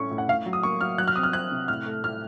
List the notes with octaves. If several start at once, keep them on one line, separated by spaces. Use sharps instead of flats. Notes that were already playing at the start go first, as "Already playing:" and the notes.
Already playing: A2 A3 C#4 C#6
A2
F#5
A2 F5
F#3
D#6
A#3 C#6
F#3 F6
F#3 F#6
F6
C4 D#6
F6
C4 F#6
C3
A2 F6
A3
A2 F6